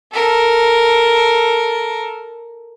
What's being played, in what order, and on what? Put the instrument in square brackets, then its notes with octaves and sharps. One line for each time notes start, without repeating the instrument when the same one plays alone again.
[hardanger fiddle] A4 A#4